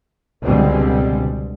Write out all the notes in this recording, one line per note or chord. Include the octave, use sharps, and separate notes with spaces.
C#2 B2 D3 G3 G#3 C4